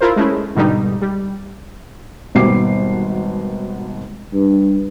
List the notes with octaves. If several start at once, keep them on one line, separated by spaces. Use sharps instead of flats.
E4 F4 A#4 C5
G#3 A3 C#4 E4
G#2 B2 D3 G3 D#4
G3
G#1 D#2 B2 G3 D6 C7
G2